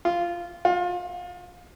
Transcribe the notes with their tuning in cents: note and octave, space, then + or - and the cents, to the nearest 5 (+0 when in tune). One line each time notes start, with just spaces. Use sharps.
F4 -10
F4 +30